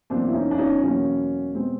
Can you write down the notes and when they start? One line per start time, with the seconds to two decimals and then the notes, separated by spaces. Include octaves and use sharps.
0.10 E2 B2 F#3 A#3 C4 D4
0.28 E4
0.34 C#4 D#4
0.51 D4
0.58 C#4 D#4
0.82 E2 B2 F#3 A#3 C#4
1.54 B2 G#3 C4